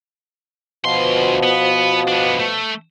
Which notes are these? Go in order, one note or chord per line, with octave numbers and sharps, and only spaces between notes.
D2 B2 F3 C6
B3
B3 D4
A3